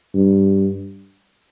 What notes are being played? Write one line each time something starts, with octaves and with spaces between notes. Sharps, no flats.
G2